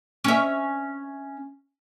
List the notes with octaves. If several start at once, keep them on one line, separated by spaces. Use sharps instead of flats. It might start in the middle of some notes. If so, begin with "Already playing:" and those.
C#4 E5